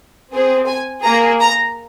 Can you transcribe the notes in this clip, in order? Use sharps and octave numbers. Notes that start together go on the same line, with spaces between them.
C4 G#4
G#5
A#3 G#4 A#5
A#5